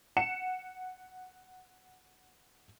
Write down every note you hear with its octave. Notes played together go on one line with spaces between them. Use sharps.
F#5 C#7 E7